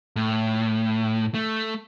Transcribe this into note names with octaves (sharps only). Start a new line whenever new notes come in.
A2
A3